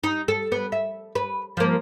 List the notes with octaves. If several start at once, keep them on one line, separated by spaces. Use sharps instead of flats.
D#4
A4
B3
E5
B4
F3 A#3